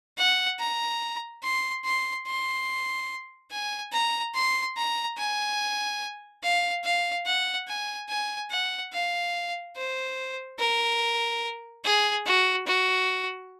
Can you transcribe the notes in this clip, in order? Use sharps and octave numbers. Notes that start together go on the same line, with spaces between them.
F#5
A#5
C6
C6
C6
G#5
A#5
C6
A#5
G#5
F5
F5
F#5
G#5
G#5
F#5
F5
C5
A#4
G#4
F#4
F#4